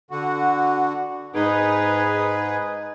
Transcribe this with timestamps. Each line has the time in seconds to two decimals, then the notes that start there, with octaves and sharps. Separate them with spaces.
0.11 D3 F#4
1.35 G#2 D#4 G#4 B4